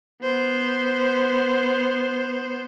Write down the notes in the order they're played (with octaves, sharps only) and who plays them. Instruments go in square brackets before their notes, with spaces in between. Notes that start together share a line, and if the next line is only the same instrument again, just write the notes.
[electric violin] B3 C5